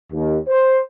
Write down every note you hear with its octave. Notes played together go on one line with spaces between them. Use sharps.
D#2
C5